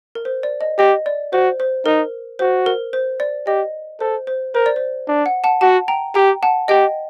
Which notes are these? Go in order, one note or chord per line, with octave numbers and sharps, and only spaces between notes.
A#4
C5
D5
D#5
G4 D#5
D5
F#4 C5
C5
D#4 A#4
F#4 C5
A#4
C5
D5
G4 D#5
A4 C5
C5
A#4 C5
D5
C5
D4
F#5
F#5 A5
F#4 F#5 A5
G5 A#5
G4 G5 A#5
F#5 A5
G4 D#5 G5